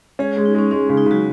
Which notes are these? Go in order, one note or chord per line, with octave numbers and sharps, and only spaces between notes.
G#3 C#4 G#4
G#3
D#4
G#3 C#4
G#3 C#4
C#3
D#4
C#3 F#3 F#4